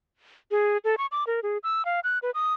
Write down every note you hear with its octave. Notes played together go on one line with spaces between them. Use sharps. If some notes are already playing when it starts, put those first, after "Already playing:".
G#4
A4
C#6
D6
A#4
G#4
E6
F5
F#6
B4
D#6